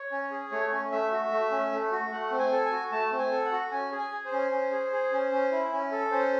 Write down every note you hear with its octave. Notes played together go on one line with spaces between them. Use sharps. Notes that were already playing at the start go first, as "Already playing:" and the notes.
Already playing: C#5
C#4
G#4
A3 C#5
C#4
A3 E5
F#4
A3
C#4
A3
F#4
A3 F#5
C4
G#5
A4
G#5
F#4
A3 A5
C4
G#5
A4
F#5
F#4
C#4 G#5
G#4
G#5
G#4
C5
C#4
C#4
G#4
G#4
C#4
C#4
E4
C#4
A4
C#4 C5